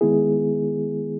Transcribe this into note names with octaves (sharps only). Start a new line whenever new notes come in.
D#3 G#3 B3 E4 G#4